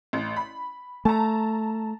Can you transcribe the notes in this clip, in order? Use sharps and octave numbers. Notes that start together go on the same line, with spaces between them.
A1
B5
A3 A5 A#5